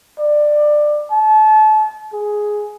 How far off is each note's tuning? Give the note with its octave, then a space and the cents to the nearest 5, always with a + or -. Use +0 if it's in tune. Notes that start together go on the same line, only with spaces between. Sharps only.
D5 +20
A5 -35
G#4 +5